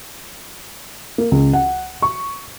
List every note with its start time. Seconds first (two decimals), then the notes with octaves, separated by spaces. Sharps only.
1.18 A#3
1.31 C#2
1.53 F#5
2.02 C#6